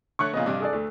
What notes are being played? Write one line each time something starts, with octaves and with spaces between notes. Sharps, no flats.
D3 A3 C#5 C#6 F#6
A#2 C#3 B3 D#5
G2 C3 D4
G#4 A4 D5
D2 A3